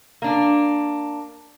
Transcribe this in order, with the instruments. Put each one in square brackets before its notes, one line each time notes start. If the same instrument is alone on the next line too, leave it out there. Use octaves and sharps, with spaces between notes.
[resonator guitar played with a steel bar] A#3 D4